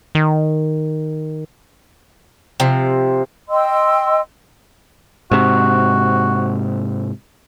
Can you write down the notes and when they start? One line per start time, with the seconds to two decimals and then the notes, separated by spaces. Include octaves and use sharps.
0.15 D#3
2.60 C3 F3
3.50 D#5 G5 C6 E6
5.31 G#2 C3 F#4